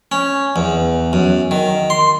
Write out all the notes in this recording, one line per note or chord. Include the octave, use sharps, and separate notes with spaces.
C#4
E2
F#2
D#3
C6